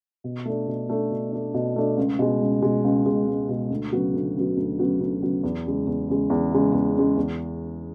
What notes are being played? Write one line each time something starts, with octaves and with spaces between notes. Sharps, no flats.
B2
A3 D4
B2
A3 D4
B2
A3 D4
B2
A3 D4
C#2
B2 G#3
C#2
B2 G#3
C#2
B2 G#3
C#2
B2 G#3
D2
C#3 F#3 B3 F#4
D2
C#3 F#3 B3 F#4
D2
C#3 F#3 B3 F#4
D2
C#3 F#3 B3 F#4
E2
C#3 G#3
E2
C#3 G#3
E2
C#3 G#3
E2
C#3 G#3
E2